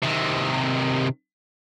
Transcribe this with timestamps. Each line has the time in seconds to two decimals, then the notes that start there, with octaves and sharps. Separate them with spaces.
0.03 C3 D#3